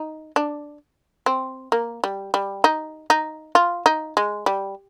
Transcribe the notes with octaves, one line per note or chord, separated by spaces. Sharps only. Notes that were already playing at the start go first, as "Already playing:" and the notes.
Already playing: D#4
D4
C4
A#3
G3
G3
D#4
D#4
F4
D#4
G#3
G3